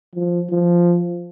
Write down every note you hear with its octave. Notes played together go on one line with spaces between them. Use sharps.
F3
F3